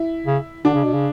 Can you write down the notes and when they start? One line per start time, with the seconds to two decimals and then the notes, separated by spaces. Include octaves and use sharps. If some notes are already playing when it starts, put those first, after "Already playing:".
Already playing: E4
0.26 C#3
0.65 D3 D4
0.74 C#3
0.84 B2
0.94 C#3